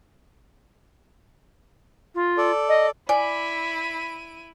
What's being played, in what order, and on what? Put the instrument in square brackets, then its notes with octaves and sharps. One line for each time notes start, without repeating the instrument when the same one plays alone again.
[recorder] F4
[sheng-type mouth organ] A4 D5
[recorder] D#5
[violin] E4 D#7 [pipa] D5 [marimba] G#5 [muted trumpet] B5